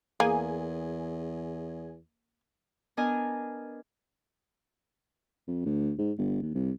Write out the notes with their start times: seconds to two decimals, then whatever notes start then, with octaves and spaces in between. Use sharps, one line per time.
0.20 E2 A#3 G#4 G#5
2.97 B3 D4 A#4 D#5 G#5
5.48 F2
5.66 D2
5.99 G#2
6.18 G1
6.42 D#2
6.55 C2